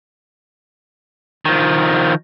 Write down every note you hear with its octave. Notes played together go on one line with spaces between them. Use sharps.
D#3 F3